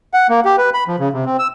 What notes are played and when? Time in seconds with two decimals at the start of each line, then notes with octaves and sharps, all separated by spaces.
0.14 F#5
0.29 A#3
0.45 G4
0.58 B4
0.74 B5
0.88 F3
1.00 C#3
1.13 C3
1.25 C4
1.39 E6